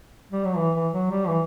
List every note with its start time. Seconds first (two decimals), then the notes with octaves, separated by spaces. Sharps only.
0.31 G3
0.44 F#3
0.57 E3
0.75 E3
0.93 F#3
1.11 G3
1.27 E3